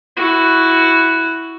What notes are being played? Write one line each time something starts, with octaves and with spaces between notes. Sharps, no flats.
E4 F#4